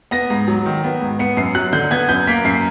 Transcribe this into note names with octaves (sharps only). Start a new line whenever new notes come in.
B3 A#6
G#2
F#3
D#3
B3
G#2
B3 C#7
F#2 C7
F#3 F#6
D3 G6
B3 G#6
F#2 G6
A#3 B6
F#2 C7